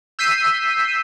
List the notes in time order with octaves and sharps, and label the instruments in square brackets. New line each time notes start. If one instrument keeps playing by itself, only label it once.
[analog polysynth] E6 G6 B6 C7 D#7